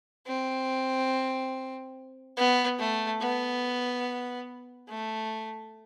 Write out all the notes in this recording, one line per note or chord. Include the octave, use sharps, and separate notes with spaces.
C4
B3
A3
B3
A3